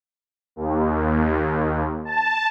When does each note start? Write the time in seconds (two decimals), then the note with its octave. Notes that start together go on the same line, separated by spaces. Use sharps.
0.56 D#2
2.05 A5